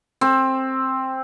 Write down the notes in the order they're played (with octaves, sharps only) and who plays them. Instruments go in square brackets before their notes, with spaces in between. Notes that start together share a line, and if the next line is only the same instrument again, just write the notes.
[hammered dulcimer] C4